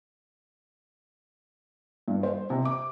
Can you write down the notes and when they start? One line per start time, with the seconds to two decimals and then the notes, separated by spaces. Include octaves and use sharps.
2.08 G2
2.23 C5
2.50 C3
2.65 D6